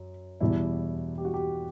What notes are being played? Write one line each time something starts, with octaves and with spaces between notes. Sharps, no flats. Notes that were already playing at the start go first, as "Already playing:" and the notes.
Already playing: F#2
E2 B2 G3 E4
G4
F#4
G4